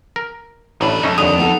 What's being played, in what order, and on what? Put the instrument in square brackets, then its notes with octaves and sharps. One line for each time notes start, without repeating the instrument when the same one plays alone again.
[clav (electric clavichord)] A#4
[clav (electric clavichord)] A1 A2 D4 [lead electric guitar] D#4 B4
[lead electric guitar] F2 [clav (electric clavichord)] A3 C#4 D#4
[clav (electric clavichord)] D#2 G#5 [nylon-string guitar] D3 [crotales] D#6
[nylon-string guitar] B3 D#4 A4